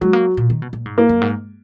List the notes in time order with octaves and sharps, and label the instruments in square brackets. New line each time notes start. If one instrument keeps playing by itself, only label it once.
[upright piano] F#3 [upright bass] G#3
[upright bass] A#3
A#2
D#3
B2
A#2
G#2
[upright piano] A#3
[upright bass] F#2
G#2